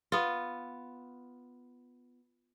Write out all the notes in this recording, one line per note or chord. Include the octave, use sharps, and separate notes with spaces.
B3 F4